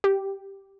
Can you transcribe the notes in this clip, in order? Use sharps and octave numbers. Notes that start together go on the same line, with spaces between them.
G4